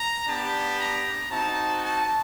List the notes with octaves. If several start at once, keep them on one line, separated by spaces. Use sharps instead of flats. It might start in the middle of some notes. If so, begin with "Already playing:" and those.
Already playing: A#5
B3 D4 G4 A5
A#5
C4 D#4 F#4 A5
A5